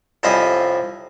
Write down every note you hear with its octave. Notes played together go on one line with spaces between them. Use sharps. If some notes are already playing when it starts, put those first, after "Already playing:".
C2 F2 C#4 C5 D#5 B5